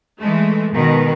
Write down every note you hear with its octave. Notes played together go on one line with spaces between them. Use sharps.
E3 G#3 A3
B2 D#3